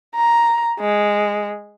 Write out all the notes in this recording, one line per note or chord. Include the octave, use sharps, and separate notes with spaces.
A#5
G#3